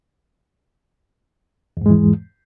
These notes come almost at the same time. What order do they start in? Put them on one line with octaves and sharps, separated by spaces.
E2 G#2 G#3 E3